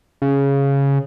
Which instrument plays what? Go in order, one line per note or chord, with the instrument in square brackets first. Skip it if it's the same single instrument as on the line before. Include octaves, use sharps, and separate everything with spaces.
[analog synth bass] C#3